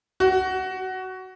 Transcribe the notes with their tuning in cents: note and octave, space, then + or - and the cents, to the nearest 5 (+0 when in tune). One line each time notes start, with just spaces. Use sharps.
F#4 +15